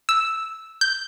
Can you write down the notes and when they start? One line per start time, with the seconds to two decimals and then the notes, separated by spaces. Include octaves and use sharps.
0.09 E6
0.81 G6